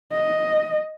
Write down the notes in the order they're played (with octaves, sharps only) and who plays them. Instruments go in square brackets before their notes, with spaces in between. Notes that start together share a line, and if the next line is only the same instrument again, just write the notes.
[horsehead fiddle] D#5